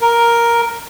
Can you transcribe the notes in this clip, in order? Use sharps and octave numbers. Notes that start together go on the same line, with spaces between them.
A#4